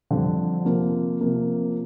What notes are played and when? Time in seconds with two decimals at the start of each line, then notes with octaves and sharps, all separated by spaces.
0.11 F2 D3 G3 C4
0.65 C3 F3 A#3
1.21 C3 F3 A#3